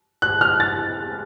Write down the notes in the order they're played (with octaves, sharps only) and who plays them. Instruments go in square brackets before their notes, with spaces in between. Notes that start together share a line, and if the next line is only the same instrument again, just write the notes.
[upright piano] F#6
F6
A6